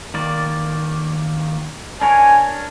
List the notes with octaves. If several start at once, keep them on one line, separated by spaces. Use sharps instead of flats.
D#3 A#3 D5
D4 A#4 C#5 G#5